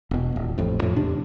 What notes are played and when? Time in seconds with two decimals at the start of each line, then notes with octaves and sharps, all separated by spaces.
0.11 E1 B2
0.36 D#1
0.58 A1 F2 A2
0.82 F2 A2 F3
0.96 E2 C3 D4